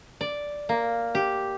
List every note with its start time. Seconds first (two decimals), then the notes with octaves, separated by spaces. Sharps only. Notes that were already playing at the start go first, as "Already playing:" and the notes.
0.21 D5
0.69 A#3
1.15 G4